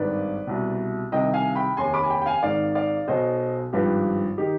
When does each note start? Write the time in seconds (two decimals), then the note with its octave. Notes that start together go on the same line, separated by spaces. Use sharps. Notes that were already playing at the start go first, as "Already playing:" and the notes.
Already playing: G#1 G2 D#3 B4 D5
0.47 C2 B2
1.12 C2 C3 D#3 D#5 G5
1.34 F5 G#5
1.55 G5 B5
1.77 F1 D#2 D#3 G#5 C6
1.94 B5 D6
2.03 G#5
2.10 G5 B5
2.22 G5
2.26 F5 G#5
2.43 G#1 G#2 D#3 D5 F5
2.75 D5 F5
3.08 B1 B2 C5 D#5
3.73 G#1 G2 F3 G4 B4
4.38 D#3 D#4 G4